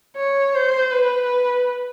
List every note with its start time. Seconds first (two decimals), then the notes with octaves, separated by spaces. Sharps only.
0.17 C#5
0.55 C5
0.91 B4